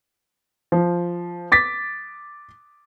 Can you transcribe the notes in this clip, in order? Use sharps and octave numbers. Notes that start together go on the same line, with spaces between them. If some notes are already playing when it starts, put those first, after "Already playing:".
F3
D6 A6 B6